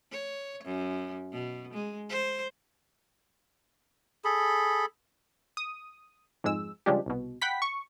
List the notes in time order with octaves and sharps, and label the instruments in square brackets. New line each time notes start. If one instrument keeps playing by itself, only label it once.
[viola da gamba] C#5
F#2
B2
G#3
C5
[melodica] G#4 A4 B5
[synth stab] D#6
F2 G#2 G#3 E6
C#3 F3 G3 G#3 D4 G4
C2 B2
F#5 G5 B5 B6
C#6